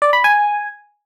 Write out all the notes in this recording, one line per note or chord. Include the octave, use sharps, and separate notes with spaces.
D5
B5
G#5